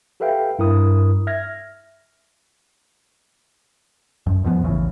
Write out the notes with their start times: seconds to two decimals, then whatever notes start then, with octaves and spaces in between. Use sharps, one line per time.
0.20 G4 A4 B4 E5 F5 G5
0.59 G2 E4 A#4 D#6
1.27 E5 F6 G#6 A#6
4.26 F#2
4.44 E2 G#2 F3 B3
4.64 A1 E2 C#3 E3